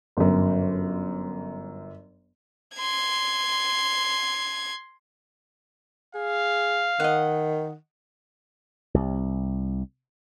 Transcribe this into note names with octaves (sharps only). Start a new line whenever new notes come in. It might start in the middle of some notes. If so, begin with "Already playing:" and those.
G1 F#2
C6 G#6
G#4 F5
D#3 D#5 F#5
C2